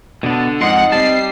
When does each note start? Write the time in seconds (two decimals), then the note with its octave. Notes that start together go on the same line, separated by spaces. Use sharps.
0.23 B2 D3 B3 D4
0.61 F2 G#2 D#4 A#4 D#5 F#5 C6
0.92 G3 C4 A5 C7